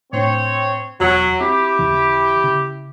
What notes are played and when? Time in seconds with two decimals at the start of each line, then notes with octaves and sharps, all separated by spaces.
0.13 A2 C4 D4 C#5
1.00 E1 E2 F#3
1.40 C4 E4 G4
1.79 D#2 C#3 E3
2.44 C#3